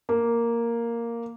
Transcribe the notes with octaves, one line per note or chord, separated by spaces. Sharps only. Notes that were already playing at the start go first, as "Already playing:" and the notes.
A#3